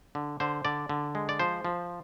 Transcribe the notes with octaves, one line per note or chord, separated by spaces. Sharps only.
D3
D3 C5
D3 D5
D3
G#3
D5
F3 C5
F3